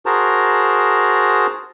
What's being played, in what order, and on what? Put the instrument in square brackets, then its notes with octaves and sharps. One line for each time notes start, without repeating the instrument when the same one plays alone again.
[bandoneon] F#4 G#4 A#4 C5 A5 A#5